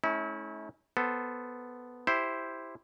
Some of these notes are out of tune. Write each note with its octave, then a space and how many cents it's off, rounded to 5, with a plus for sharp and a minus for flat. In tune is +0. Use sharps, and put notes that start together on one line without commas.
A3 -35 C#4 -5 E4 -35
B3 +0 A4 +0 C5 +0
E4 +0 G4 +0 C5 +0